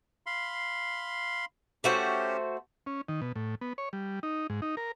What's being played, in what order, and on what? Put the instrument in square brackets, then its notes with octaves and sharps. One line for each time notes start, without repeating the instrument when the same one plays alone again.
[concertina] F5 B5 C6
[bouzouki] A3 F#4 C5 [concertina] C#4 G4
[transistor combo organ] C#4
D#3
B2
A2
B3
C#5
G3
D#4
G#2
D#4
A#4